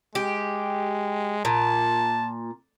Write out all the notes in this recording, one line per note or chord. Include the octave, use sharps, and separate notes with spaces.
G#3 G4
A#2 A5